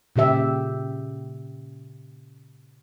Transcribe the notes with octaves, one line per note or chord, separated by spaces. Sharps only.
A#2 C#3 G4 E5